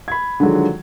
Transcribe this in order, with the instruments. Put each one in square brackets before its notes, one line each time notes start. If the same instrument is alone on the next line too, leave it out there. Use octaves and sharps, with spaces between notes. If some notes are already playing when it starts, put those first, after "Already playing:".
[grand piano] B5 G#6
D3 D#3 F3 F#3 G#3